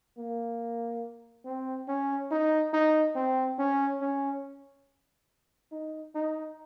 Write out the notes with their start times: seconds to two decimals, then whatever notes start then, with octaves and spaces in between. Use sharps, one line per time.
0.18 A#3
1.45 C4
1.88 C#4
2.31 D#4
2.74 D#4
3.16 C4
3.59 C#4
4.01 C#4
5.72 D#4
6.15 D#4